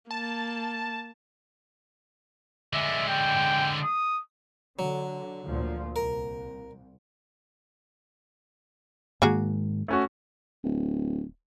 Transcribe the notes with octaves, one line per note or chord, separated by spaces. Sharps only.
A#3 A5
D3 G#3 E5
G5
D#6
D3 F#3
D2 A#2 F3
C2 A#4
G#2 D#3 G#3 A#3 F#4 G#4
A3 C#4 F#4
D1